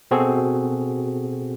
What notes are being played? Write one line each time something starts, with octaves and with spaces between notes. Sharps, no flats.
B2 C4 F#4 G#4 A4